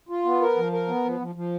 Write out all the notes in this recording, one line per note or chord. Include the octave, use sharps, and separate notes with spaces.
F4
B3
A#4
F3
A#4
B3
F3
F3
F3